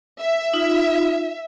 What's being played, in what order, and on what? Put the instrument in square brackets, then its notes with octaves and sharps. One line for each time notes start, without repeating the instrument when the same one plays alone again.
[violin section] E5
[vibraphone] D#4 F4